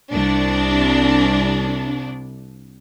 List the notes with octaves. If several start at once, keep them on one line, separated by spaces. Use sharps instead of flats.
C2 D4